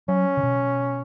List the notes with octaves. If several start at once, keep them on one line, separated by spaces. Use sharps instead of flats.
F#3 C#4
C#3
B2